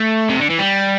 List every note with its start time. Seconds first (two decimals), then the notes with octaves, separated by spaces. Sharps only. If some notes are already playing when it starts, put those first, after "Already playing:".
Already playing: A3
0.29 C3
0.40 D3
0.50 E3
0.59 G3